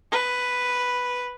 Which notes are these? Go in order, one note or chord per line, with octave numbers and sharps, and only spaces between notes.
B4